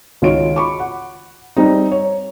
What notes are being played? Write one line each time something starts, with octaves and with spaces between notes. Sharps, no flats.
C#2 D#3 F4 F#4 C#5 D7
B5 C#6 D6
F#5
G3 C4 D#4
C#5